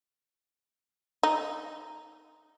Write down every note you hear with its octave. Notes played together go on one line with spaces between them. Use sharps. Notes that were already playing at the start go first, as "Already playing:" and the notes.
D#4